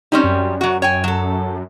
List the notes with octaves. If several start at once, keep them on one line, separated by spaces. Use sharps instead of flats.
G3 C4 C#4 D#4
F#2
F#3 F#4
C#5 G5 G#5
F#3 A4